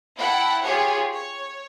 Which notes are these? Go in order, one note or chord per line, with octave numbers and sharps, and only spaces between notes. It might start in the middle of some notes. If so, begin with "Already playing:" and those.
E4 F#5 G5 A5
F4 G4 G#4 C#5
C#5